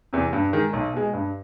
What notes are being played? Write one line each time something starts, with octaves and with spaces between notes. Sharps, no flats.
E2 C3
G2
D#3 G#3
B1
B2 G#3
G2